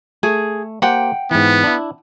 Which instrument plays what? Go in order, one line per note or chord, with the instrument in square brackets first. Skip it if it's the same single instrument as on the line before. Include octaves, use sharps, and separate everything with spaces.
[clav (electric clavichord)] A3 [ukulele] G#4
[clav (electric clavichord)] A#3 G4 C5 [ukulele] F#5 G5
[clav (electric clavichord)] G#2 E3 [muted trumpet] B3
[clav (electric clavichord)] D4 E4